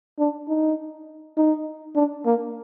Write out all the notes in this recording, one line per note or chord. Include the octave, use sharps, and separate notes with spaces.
D4
D#4
D#4
D4
A#3